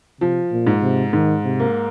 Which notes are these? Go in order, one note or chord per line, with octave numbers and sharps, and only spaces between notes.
C3 F3
A#2
G#2
C3
G#2 D#3
C3
A#3